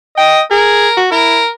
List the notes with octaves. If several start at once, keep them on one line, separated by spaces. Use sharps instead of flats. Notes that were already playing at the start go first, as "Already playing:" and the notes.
D#5 G5
G#4 A#4
F#4
E4 A#4